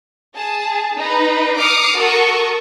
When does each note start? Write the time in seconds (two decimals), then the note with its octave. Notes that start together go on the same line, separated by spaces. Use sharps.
0.36 G#4 A5
0.97 D#4 B4
1.58 D6 D#6 F6 C7 C#7
1.97 F#4 A4 A#4 C#6 D#6